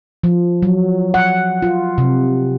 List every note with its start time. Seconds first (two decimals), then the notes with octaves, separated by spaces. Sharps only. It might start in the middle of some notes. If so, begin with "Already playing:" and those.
0.24 F3
0.63 F#3
1.14 F#5
1.62 F4
1.98 C3